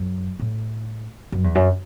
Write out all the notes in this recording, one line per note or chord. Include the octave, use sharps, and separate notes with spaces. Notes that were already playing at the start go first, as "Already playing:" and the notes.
Already playing: F#2
A2
F#2
E2
F#2